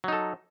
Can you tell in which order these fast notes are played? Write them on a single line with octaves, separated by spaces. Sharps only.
F#3 D#4 A4